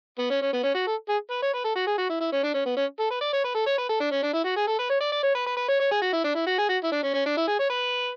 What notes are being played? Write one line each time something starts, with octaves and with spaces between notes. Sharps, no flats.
B3
C#4
C#4
B3
C#4
F#4
A4
G#4
B4
C#5
B4
A4
F#4
G#4
F#4
E4
E4
C#4
D4
C#4
B3
C#4
A4
B4
D5
C#5
B4
A4
C#5
B4
A4
D4
C#4
D4
E4
F#4
G#4
A4
B4
C#5
D5
D5
C#5
B4
B4
B4
C#5
C#5
G#4
F#4
E4
D4
E4
F#4
G#4
F#4
E4
D4
C#4
C#4
D4
E4
G#4
C#5
B4